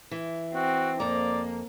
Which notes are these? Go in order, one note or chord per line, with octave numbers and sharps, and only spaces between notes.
E3
C4 F#4
F2 A#3 D5 A#5